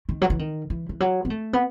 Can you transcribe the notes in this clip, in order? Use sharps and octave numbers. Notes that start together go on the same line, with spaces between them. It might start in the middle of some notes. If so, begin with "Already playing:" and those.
D#3
F#3
E3
D#3
E3
E3
F#3
B3
A3
B3